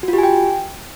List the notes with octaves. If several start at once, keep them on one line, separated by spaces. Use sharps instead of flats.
F#4
F4
G4
G#5
G5